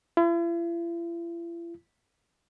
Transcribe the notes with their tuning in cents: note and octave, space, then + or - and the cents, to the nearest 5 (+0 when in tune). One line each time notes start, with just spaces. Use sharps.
E4 +45